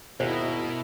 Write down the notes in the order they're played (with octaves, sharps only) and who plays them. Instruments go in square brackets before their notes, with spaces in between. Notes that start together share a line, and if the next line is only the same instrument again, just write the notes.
[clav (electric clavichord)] G#1 D#2 [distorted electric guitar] B2 [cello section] E4 A#4 [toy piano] C5